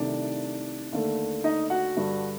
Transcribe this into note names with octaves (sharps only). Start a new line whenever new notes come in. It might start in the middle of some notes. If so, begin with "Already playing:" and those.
Already playing: C2 C3 D#3 A3 D4 D5
D#2 D3 A3
D#4 D#5
F#4 F#5
G2 D3 G3